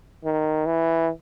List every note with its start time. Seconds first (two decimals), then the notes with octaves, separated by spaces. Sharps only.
0.24 D#3
0.66 E3